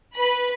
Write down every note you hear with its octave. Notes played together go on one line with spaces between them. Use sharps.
B4 B5